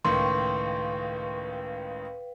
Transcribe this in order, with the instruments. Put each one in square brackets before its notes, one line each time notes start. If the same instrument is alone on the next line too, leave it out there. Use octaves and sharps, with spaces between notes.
[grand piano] C#2 A2 D#3 [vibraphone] B4 F5 G5 [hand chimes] C6 C#6